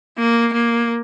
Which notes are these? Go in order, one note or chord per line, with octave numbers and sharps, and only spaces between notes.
A#3
A#3